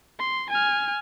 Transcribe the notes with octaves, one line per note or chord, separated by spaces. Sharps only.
C6
G#5 F6